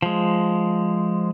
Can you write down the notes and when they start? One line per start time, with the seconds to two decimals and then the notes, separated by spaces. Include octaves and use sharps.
0.02 F3 G#3